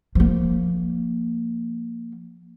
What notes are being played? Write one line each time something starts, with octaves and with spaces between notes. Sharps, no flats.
F3 A#3